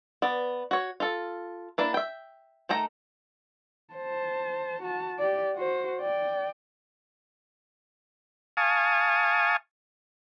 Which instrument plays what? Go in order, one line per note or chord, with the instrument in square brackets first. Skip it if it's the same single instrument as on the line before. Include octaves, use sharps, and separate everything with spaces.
[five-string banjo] B3 D5
F#4 C#5
F4 A4
A#3 D4 E4
E5 G5
D#3 A3 G5 A#5
[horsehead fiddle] C5 A5
F#4 A5
G4 D5
F#4 C5
D5 G5
[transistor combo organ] F5 G#5 A5 C#6 D#6